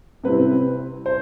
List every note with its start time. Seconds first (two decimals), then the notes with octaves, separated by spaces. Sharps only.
0.24 C3 G3 C4 E4 B4
1.06 C5